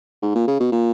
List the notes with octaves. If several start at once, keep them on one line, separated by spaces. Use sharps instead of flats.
G#2
A#2
C#3
B2
A#2